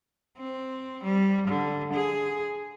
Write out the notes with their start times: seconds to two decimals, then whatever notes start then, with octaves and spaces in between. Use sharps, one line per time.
0.37 C4
1.03 G3
1.48 D3
1.93 G#4